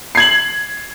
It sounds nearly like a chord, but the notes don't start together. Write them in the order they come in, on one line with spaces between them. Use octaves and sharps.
C7 G#6 F#7